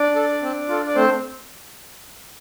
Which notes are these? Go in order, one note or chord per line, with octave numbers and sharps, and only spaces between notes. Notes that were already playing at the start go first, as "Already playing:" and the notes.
Already playing: D4 D5
A4
C4
F4 A4
D5
A3 C4 C5